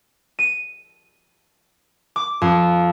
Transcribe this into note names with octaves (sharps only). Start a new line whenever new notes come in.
D#7
D6
F2